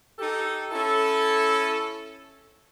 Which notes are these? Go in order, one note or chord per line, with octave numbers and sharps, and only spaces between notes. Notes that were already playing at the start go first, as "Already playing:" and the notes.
D#4 G4 A4
C#4 E4 A4